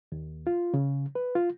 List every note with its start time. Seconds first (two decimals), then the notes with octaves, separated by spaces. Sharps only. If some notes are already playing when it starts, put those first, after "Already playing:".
0.12 D#2
0.47 F4
0.74 C#3
1.15 B4
1.35 F4